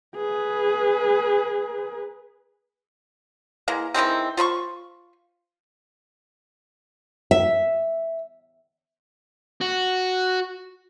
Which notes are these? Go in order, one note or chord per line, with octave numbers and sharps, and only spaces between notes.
G#4 B4
E3 G#3 A#3
D#3 E3 G#3 C4
F4 C5 B5 C#6
E5
F#4